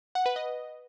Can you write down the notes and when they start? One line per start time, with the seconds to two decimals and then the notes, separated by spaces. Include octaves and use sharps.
0.15 F#5
0.26 B4
0.36 D#5